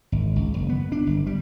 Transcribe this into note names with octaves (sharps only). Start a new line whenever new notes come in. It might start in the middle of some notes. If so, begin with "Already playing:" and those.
G#1
C#2
F#1
B3
D4
G1
G3